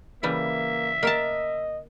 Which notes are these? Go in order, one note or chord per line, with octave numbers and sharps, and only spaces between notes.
C#3 E3 G3 A#3 E5
A#3 A#4 D#5 A5